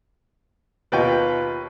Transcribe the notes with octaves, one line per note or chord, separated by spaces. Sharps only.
D#2 B2 F4 B4 G5